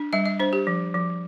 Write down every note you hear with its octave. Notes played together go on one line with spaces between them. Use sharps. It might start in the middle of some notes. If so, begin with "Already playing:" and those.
Already playing: D4
G3 D#5
D#5
D4 C5
G4
F3
F3